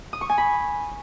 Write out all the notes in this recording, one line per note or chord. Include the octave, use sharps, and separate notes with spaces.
D#6
C#6
G#5
B5